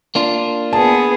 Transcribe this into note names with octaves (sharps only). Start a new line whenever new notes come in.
A#3 D4 F4
B3 G#4 A5